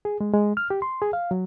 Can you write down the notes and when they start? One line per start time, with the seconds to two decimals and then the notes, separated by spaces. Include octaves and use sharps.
0.05 G#4
0.21 G#3
0.34 G#3
0.57 F6
0.70 G4
0.82 C6
1.02 G#4
1.13 F5
1.31 F#3